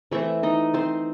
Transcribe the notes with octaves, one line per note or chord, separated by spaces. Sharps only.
E3 A3 C4 E4 E5
D#4 D#5
C4 C5